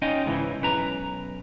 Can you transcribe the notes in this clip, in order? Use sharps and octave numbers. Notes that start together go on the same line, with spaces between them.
C#4 D#4 F4 D#5 G5
G#2 C#3 E3 E4
B1 C#4 B4 A#5